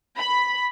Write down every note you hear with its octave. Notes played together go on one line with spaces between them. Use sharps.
B5